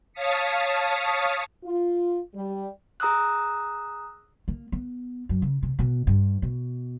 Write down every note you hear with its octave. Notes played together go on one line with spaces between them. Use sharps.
C#5 F5 A5 D#6 B6 C#7
F4
G3
G#4 A#5 D#6 E6 F#6
A#3
B3
F#2
C#3
C3
B2
G2
B2